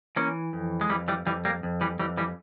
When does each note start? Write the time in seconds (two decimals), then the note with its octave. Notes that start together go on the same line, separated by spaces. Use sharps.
0.16 E3 A#3 C#4
0.53 F2
0.81 G#3
0.89 F2 E3 G3
1.08 E3 G3
1.26 F2 E3 G3
1.45 G3 A#3
1.63 F2
1.81 E3 G3
1.99 F2 E3 G3
2.17 E3 G3